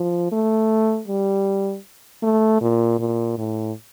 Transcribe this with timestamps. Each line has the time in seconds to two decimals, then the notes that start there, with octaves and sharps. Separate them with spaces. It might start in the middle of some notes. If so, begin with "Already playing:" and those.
Already playing: F3
0.32 A3
1.08 G3
2.23 A3
2.61 A#2
2.99 A#2
3.38 A2